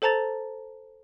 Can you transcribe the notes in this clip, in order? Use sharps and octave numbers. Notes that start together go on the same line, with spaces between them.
A4 C5 A5 A#5 A6